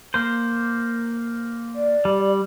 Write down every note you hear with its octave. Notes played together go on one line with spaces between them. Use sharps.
A#3 C5
D5
G3